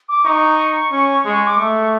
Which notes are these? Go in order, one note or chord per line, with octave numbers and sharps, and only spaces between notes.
D6
D#4 C#6
C#4
G#3
D6
A3 C#6